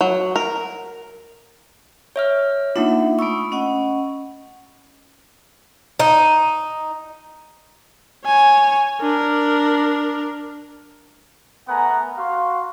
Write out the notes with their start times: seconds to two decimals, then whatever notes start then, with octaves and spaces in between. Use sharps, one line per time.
0.01 F#3
0.36 A#4
2.16 C#5 E5 F6
2.76 A#3 D4 D#4 F4 E5 F#5
3.19 A3 B5 C#6 D#6 E6
3.52 C#4 D#5 F#5
6.00 D#4
8.25 C#5 G#5
9.01 D4 A#4
11.68 A3 B3 A#4 F#5 G#5 A#5
12.18 F#4 F5 C6